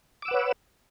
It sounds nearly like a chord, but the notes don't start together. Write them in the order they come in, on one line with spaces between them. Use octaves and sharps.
D6 E6 F#5 B4 C#5